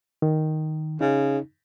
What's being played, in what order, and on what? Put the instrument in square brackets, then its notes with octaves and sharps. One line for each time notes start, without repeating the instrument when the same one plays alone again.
[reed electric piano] D#3
[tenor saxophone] C#3 [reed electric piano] D#4